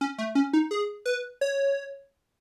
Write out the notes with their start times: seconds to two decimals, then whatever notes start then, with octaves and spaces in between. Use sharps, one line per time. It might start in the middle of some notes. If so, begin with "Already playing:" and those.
0.01 C#4
0.18 A3
0.35 C#4
0.53 D#4
0.71 G#4
1.06 B4
1.41 C#5